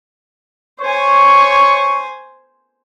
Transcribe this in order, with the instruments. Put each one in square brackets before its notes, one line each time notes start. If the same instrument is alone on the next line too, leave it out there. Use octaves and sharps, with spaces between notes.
[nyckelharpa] C5 G#5 [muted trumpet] C#5 [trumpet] C#6